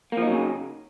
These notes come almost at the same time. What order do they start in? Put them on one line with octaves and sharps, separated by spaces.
A#3 F3 D#4 F#3 C#3